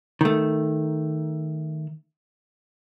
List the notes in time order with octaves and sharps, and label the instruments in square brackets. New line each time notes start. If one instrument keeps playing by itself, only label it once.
[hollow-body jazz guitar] D#3 A3